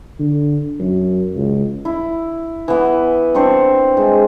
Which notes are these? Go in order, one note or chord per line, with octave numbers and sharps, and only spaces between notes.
D3
F#2
C#2
E4
E3 B3
C4 D4 C5 C#6
G#3